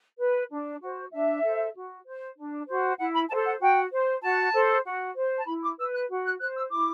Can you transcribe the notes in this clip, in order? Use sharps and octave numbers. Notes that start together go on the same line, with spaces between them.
B4
D4
F#4 C5
D4 E5
A4 C5
F#4
C5
D4
F#4 C5
E4 F#5
B5
A4 C5 A5
F#5
F#4 G5
C5
F#4 A5
A4 C5
F#4
C5
A5
E4 B5
D6
B4 E6
F#6
F#4
F#6
C5 F#6
E6
E4 D6